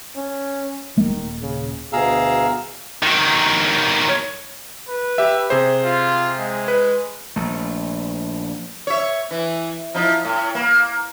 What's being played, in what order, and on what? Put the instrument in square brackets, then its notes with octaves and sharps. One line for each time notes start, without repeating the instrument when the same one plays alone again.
[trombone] C#4
[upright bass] D#1 A#2 [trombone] D#3
[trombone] C#3
[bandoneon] D2 B2 G#4 F5 A#5 E6
[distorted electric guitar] D#3 F#3
[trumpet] B4
[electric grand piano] G4 E5
C3 G#4 C5
[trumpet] F4
G#3
[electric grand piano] B4
[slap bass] A#1 A3
[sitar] C#5 E5
E3
F3 D#4 E4
A2
A#3